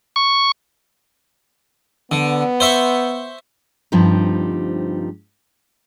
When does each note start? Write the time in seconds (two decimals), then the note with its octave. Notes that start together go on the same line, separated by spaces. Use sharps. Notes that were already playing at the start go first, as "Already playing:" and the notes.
0.16 C#6
2.11 D3 B3
2.60 C5 E5 C#6
3.92 D2 G2 F3 G3 C4 D#4